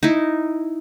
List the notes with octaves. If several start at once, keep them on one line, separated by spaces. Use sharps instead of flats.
D#4 E4